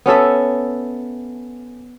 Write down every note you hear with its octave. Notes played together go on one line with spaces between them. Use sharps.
B3 C#4 A4 E5